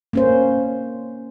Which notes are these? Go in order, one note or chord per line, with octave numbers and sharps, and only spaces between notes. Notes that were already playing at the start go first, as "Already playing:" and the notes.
A#3 C#4 C5